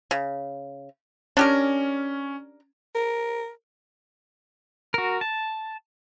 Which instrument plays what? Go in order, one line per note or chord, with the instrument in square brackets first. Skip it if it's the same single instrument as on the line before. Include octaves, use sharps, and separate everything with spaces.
[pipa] C#3
[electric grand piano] C#4 [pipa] D4 G4 A#4
[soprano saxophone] A#4
[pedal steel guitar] F#4 A#4
A5